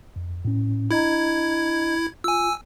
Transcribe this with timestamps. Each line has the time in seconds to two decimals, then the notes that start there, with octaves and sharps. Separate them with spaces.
0.16 F2
0.45 A2 C#4
0.91 D4 E4 D#5 A#5 G#6
2.24 F4 G#5 E6